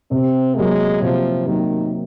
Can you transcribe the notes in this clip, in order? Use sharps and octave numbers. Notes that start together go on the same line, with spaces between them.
C3 C4
F#3 G#3 A#3
C3 F3
D#3 F#3 A#3